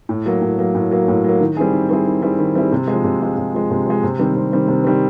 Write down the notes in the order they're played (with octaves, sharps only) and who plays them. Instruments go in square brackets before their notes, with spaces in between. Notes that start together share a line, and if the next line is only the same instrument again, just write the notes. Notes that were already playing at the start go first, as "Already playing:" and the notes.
[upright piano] A2
F#3 A#3
A2
F#3 A#3
A2
F#3 A#3
A2
F#3 A#3
D#3
G3 C4 E4 G#4
D#3
G3 C4 E4 G#4
D#3
G3 C4 E4 G#4
D#3
G3 C4 E4 G#4
C3
G#3
F3
C3
F3 G#3
C3
F3 G#3
C3
F3 G#3
C3
D#3 G3 C4
C3
D#3 G3 C4
C3
D#3 G3 C4